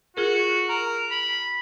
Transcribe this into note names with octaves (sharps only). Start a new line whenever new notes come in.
F4 F#4 G#4 A#4
A#4 A#5
B5